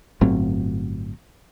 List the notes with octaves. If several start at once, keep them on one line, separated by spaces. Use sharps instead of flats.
G1 A2 F#3 C4